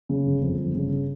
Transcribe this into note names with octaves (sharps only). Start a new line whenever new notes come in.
C#3
G1
F2
G1
C#3